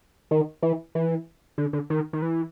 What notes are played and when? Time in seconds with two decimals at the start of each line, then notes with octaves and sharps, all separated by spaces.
0.31 D#3
0.62 E3
0.95 E3
1.58 D3
1.73 D3
1.90 D#3
2.13 D#3
2.22 E3